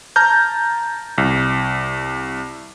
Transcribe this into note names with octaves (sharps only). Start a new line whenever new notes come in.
A5 A#5 F6 G6
C2